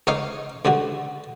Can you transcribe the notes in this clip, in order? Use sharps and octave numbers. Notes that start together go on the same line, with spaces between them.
C#2 D#4 C#5 F5 C#6 D6
C#2 D3 G3 F#4